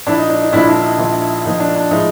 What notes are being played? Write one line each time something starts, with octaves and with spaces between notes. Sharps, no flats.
A#1 A#2 F3 D4 E4
D#4
D4
D#4
A#1 A#2 F3 D4 E4
D4 E4
D#4
A#1 A#2 F3
A#1 A#2 F3 D#4
D4
D4
A2 F3 G#3 D#4